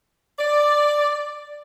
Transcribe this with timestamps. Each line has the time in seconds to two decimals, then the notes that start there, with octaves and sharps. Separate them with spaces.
0.39 D5